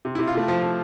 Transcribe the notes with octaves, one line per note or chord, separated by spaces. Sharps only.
C3
E4
C3
F4
C3 A3
F3
F3